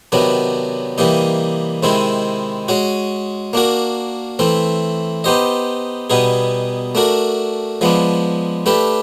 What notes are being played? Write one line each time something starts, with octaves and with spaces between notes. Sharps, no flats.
C3 D#3 F#3 B3 D4
C3 E3 G3 A#3 D#4
C3 D#3 G#3 C4 E4
G#3 C#4 F#4
A#3 D4 F#4 A#4
E3 A3 C4
B3 D#4 G4 C5 D#5
B2 G3 B3 D#4 G#4
A3 D4 F#4 A#4
F3 G#3 B3 D4
A3 D4 G4 B4